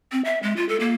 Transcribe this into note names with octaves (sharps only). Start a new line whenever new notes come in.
C4
E5
G#3
F4
A4
A#3